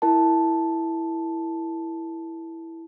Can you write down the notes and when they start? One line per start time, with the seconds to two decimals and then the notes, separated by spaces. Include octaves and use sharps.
0.02 E4 A#4 A5